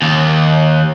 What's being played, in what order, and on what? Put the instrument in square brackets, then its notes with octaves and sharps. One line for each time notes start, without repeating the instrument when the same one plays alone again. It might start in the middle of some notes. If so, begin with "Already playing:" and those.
[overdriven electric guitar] D#2